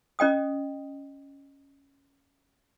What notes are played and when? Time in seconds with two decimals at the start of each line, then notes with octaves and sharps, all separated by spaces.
0.19 C#4 D#5 G5 D#6